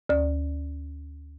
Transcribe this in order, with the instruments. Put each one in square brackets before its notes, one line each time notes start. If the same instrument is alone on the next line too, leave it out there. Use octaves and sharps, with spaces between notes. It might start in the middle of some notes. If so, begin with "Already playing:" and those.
[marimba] D2 D5